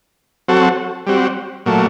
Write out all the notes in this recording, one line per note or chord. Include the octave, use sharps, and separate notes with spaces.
F#3 C4 F#4 A4
G3 C4 F#4
A#2 F#3 A3